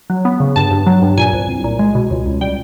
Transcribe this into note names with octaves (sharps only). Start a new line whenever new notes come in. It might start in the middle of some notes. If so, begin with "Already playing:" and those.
F#3
B3
C#3
G2 A5
G2
F#3
G2
A#2 G#5
C2
C2
A#2
G#3
B2
C#2
C#2
G3 G5